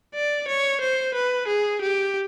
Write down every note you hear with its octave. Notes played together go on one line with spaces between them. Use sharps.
D5
C#5
C5
B4
G#4
G4